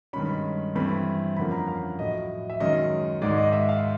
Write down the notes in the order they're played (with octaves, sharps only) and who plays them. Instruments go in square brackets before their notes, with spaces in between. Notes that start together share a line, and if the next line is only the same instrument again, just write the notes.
[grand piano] G2 D#3 G#3 C#4 B5
G2 E3 A3 C4 B5
F2 D3 F3 A#3 C#4 B5
A#5
F5
A2 F#3 A3 D#5
E5
F#2 D#3 G#3 C#4 D#5
G#2 D#3 G#3 D5
D#5
E5
F5